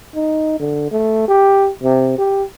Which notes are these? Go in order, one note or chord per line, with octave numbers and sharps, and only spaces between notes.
D#4
D3
A3
G4
C3
G4